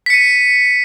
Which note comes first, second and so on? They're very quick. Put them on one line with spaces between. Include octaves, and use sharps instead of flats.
B6 C#7 D#7